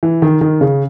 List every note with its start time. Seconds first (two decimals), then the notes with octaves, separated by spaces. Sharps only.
0.03 E3
0.22 D#3
0.41 D#3
0.61 C#3